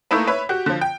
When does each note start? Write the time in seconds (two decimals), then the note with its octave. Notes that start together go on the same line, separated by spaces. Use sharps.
0.11 A3 A#3 D#4 E4 B4
0.27 B4 C#5 E5
0.49 F#4 G4
0.66 D3 F3
0.81 G5